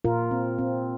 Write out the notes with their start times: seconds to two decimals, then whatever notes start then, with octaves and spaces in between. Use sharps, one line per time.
0.05 A#2 F4 A#4
0.31 C4
0.58 C4